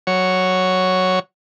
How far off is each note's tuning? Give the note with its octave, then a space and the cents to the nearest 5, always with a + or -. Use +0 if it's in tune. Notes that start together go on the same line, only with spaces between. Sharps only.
F#3 +0 C#5 +0